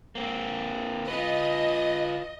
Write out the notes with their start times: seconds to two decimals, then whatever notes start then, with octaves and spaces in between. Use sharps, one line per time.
0.15 A#3 C4
1.08 F4 B4 D#5